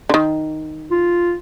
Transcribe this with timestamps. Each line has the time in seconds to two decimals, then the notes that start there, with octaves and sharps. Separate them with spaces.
0.09 D3 D#3
0.91 F4